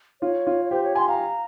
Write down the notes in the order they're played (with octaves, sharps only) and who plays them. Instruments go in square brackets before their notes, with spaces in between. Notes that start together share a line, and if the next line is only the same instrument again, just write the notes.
[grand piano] F4 [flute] C#5
[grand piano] F4
[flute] C#5
[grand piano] G4 [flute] C5
[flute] C#5
[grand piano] G#5 [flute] C6
[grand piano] F5 [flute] A#5